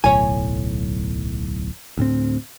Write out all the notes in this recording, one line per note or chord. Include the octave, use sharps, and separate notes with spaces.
D1 B1 A2 C#5 G#5
D2 A2 C4